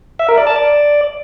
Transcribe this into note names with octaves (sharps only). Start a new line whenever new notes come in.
E5
A#4
D5
A5
D5